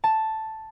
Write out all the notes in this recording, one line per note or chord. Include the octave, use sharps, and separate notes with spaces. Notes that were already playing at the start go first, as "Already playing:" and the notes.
A5